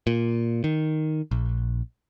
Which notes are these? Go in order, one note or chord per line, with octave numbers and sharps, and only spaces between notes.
A#2
D#3
A#1